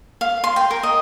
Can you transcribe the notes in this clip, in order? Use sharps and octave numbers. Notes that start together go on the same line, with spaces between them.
F5
C6
G5
A#4
D#5